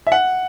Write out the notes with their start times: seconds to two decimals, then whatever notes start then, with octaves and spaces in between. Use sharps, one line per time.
0.07 E5
0.12 F#5